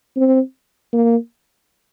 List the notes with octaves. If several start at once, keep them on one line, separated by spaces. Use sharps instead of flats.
C4
A#3